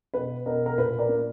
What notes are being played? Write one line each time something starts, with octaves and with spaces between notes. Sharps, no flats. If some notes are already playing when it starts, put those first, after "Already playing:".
B2 B4
B2 A#4
A#4
A#2 B4
A#4 D5
A#3